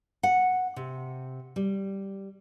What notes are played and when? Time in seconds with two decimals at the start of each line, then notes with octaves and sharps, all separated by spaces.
0.23 F#5
0.76 C3
1.56 G3